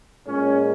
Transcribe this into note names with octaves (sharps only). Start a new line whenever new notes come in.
A#2 G#3 C#4